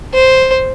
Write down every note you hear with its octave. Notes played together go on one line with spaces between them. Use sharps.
C5